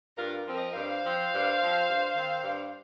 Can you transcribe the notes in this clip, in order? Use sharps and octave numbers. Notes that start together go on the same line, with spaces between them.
G2 F4 A#4
F3 C4
A#4 D#5
G2 C5 F5
F3 C4
G2
F3 C4
G2
D#3 C4
G2